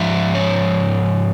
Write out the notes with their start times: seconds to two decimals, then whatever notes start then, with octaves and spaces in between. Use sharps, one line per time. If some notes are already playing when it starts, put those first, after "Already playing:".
Already playing: G#2 F3 E5
0.35 C#5